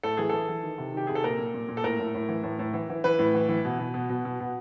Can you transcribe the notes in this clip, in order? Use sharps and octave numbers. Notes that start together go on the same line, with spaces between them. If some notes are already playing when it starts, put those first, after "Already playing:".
A2 A4
E3 G#4
E3 A4
E3
D#3
C3
D#3 G4
C3 G#4
A4
A#2 A#4
A#2
A#2
A#2
A4
A2 A#4
A2
A2
E3
A2
A2
E3
E3
E3 B4
A2
E3
E3
B2
B2
B2
B2
B2
B2